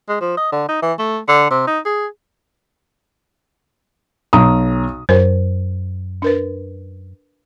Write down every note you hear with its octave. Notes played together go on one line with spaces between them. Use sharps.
G#3
F3
D#5
D3
D#4
E3
A3
D3
C3
D#4
G#4
B1 A#5 D#6
F#2 A#4 C5
D4 A#4 B4